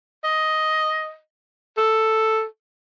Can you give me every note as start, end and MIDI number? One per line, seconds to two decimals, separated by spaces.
0.24 1.17 75
1.77 2.45 69